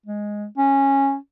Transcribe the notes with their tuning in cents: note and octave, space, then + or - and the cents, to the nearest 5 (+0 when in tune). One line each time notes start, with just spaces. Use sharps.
G#3 +0
C#4 -10